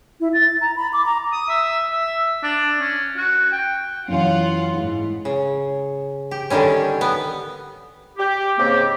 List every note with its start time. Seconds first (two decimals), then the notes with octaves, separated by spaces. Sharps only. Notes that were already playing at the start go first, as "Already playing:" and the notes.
0.20 E4
0.34 A6
0.61 A#5
0.76 B5
0.93 D6
1.06 A#5
1.33 D#6
1.49 E5
1.92 E5
2.43 D4
2.80 C#4
3.17 F#4
3.53 G5
4.08 F#2 E3 C#4 F4 F#5
4.74 G#2 E4
5.25 C#3
6.31 G4
6.50 D3 D#3 G3 C#4
7.01 B3
8.18 G4
8.58 G#2 C#3 A#3 C4 G4